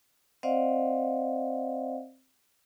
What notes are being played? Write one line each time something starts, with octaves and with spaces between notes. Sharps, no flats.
C4 C5 D5 D#5 F5 F#5